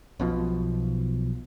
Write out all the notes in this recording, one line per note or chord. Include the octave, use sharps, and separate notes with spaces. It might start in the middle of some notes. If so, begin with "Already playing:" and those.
B1 B2 F3